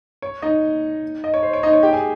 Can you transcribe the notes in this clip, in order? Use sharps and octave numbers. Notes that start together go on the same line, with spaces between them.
C#5
D#4 D#5
D#5
C#5
C5
C#5
D#4 D#5
C#5
G4 G5
G#4 G#5